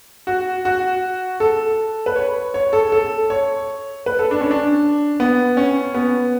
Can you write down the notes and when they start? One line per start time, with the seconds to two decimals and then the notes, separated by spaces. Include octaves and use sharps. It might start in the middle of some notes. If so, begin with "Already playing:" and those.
0.27 F#4
0.65 F#4
1.40 A4
2.06 B4
2.16 C#5
2.54 C#5
2.73 A4
2.92 A4
3.30 C#5
4.06 B4
4.19 A4
4.31 D4
4.41 C#4
4.51 D4
5.20 B3
5.57 C#4
5.95 B3